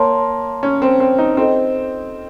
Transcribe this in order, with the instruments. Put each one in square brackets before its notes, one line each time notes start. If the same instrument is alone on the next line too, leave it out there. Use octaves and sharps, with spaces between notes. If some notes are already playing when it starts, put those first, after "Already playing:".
Already playing: [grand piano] A#3 [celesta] C#5 A5 C6
[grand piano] C#4
C4
C4
D#4
[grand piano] C4 [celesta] F4 A4 D#5